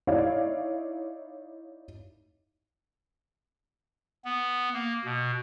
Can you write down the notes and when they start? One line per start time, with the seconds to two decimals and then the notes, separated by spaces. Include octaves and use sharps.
0.07 D#4 E4 C#5 D5 F5
4.25 B3
4.73 A#3
5.05 B2